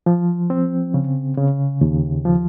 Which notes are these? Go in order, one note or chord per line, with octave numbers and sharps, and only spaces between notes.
F3
C4
C#3
C#3
D#2
F3